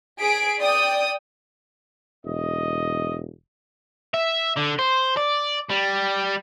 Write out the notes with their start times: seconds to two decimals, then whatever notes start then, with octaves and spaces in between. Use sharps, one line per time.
0.20 G#4 B6 D7
0.60 D5 G5 D#6
2.25 E1 D#5
4.14 E5
4.57 D3
4.79 C5
5.17 D5
5.70 G3